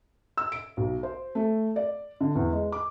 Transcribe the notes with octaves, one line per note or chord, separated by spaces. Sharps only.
E6
D7
B1
C5
A3
D5
D3
E2
G#3
D6